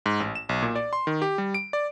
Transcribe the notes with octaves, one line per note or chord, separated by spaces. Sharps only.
G#2
A1
E7
B1
A#2
D5
C6
D#3
G4
G3
D7
D5